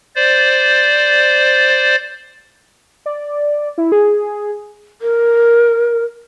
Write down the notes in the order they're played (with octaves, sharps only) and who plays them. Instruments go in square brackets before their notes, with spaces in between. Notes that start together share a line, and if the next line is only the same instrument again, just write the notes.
[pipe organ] C5 D5
[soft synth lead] D5
E4
G#4
[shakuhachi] A#4